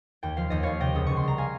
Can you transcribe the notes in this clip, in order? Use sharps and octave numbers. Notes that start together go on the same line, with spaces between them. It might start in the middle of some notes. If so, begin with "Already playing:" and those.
D#2 G5
F3 F5
D#2 D#5
D#2 C#5 F5
C3 D#5 G5
C#2 D#6
C#2 C#6
C6
G3 A#5
F5 G#5